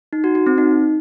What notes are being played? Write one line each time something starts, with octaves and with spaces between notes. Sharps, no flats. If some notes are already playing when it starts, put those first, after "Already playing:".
D#4
F#4
F#4
C4
D#4